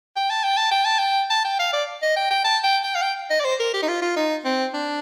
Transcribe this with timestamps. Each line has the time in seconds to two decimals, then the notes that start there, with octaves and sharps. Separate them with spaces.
0.16 G5
0.30 A5
0.44 G5
0.57 A5
0.71 G5
0.86 A5
0.99 G5
1.30 A5
1.45 G5
1.59 F5
1.73 D5
2.02 D#5
2.16 G5
2.31 G5
2.45 A5
2.64 G5
2.83 G5
2.95 F5
3.02 G5
3.30 D#5
3.40 D5
3.45 C5
3.60 A#4
3.74 G4
3.83 D#4
3.88 F4
4.02 F4
4.16 D#4
4.45 C4
4.74 D4